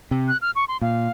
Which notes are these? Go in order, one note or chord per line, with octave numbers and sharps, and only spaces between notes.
C3
F#6
F6
C#6
C6
A#2 F5